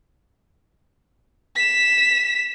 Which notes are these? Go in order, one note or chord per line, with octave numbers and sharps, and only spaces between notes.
B6 E7